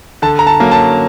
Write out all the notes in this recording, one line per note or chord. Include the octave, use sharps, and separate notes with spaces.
D3 A5
A#5
A5
F#3 A#3 C#4
A5